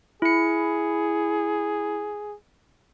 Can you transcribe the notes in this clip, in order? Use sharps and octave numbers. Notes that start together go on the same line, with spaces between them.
E4 G#4 C#7